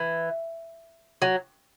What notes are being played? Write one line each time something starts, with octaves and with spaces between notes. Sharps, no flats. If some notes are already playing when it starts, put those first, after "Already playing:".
Already playing: E3
F#3